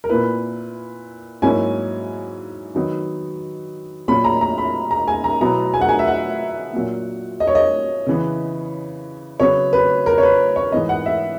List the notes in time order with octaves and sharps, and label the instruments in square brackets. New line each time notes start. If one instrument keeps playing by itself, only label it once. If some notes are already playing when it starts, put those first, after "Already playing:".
[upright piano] A#4
A#2 A#3 E4 B4
G#2 F#3 A#3 C#4 E4 G#5
D#3 F#3 B3 D#4
A#2 F#3 A#3 C#4 B5
A#5
A#5
B5
A#5
G#5
A#5
B2 F#3 B3 E4 A#5
G#5
F#5
G#5
E5
F#5
A#2 F#3 A#3
D#5
C#5
D#5
C#3 E3 B3
C#3 F#3 B3 C#5
B4
A#4
C#5
B4
C#5
G#2 E3 B3 D#5
F#5
E5